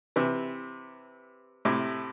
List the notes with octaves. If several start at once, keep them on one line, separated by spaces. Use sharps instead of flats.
C3 E3
A2 C3